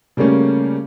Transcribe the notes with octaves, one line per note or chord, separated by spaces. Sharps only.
C#3 G3 A3 A#3 C#4